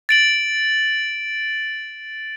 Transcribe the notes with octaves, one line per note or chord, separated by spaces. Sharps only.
A6 D7 F#7